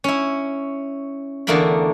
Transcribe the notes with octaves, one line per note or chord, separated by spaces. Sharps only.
C#4 E4
E2 D3 A3 A#3 A#4 B5